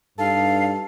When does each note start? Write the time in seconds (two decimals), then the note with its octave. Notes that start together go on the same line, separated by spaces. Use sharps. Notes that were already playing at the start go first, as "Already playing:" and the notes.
0.19 G2 D#4 A4 F5